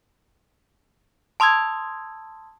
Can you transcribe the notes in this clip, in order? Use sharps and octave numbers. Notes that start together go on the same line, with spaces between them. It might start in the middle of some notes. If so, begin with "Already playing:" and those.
A5 C6 D#6 E6 G#6